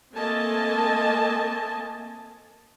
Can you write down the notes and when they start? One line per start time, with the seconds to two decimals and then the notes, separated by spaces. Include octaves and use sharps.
0.16 A3 A#3 C4 D#5 G#5 A5